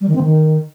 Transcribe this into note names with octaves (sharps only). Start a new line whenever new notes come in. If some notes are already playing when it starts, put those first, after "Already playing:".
G3
D#3
C4
D#3